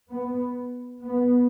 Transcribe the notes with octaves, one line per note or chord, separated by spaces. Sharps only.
B3
B3